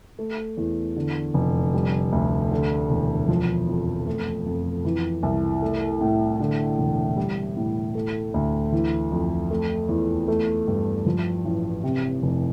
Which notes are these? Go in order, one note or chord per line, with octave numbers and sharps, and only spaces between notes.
A3
E2
D3
F1
G3
D2
D3
E1
F3
F2
A3
F2
E3
C2
A3
A2
D3
E1
G3
A2
A3
D2
E3
F2
A3
E2
A3
G2
F3
A1
C3
F1